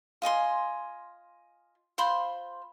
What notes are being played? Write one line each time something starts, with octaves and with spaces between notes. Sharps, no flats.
F4 D#5 G#5 C6
F4 C5 B5 C6